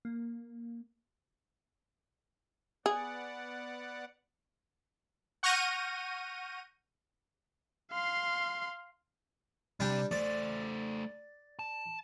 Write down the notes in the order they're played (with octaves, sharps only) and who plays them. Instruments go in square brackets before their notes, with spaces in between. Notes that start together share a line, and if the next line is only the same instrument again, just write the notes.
[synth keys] A#3
[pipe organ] B3 D5 F#5 [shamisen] G#4
[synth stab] F#5 C#6 F6 G6 A#6 D#7
[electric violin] F5 C6
[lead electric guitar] C3 [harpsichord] G3 D4 G4
[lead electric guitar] A3 C5 [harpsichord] D5
[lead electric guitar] A5